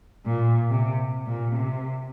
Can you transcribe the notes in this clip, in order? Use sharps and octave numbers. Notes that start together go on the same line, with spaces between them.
A#2
C3
A#2
C3